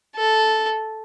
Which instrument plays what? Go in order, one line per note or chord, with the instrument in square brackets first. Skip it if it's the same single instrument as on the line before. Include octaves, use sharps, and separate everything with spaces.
[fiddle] A4